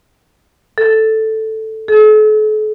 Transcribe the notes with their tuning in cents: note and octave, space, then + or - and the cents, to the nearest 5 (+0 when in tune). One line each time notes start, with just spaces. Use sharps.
A4 +0
A4 -45